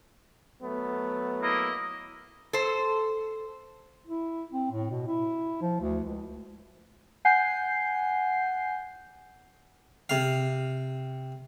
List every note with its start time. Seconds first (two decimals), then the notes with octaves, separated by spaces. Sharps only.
0.61 F#3 A3 B3
1.40 A#3 E4 D#5
2.53 A4 C5
4.07 E4
4.52 C4
4.71 A2
4.91 B2
5.07 E4
5.62 F3
5.81 D2
6.04 C#2
7.25 F#5 G#5 G6 C7
10.09 C3 F5